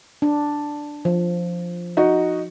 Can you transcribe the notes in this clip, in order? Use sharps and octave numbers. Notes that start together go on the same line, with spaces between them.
D4
F3
D#4 F#4